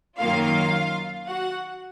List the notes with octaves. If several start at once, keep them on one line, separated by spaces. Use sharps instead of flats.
F#2 D#3 F#3 A#3 F4 F5
F#4 F#5